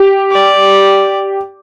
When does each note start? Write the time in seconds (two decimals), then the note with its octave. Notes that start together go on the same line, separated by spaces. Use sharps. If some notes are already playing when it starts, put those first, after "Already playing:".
Already playing: G4
0.31 D5